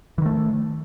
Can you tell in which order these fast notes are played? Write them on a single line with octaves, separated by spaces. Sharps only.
E3 D#3 A3